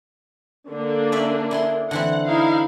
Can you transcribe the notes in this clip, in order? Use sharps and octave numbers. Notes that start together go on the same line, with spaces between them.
D3 A#3 D4
C#4 D5 E5
E4 G#4 C6
D3 E3 C4 F#5
D#4 E4 F5